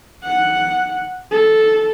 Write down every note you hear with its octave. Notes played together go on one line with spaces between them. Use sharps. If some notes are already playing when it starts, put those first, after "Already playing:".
F#5
A4